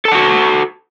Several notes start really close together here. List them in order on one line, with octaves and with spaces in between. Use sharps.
A4 A5 F#5 F#4